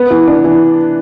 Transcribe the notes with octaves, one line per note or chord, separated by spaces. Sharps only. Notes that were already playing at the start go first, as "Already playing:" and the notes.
Already playing: B3
E3
D4
E3